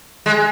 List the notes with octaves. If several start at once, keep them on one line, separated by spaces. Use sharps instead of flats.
G#3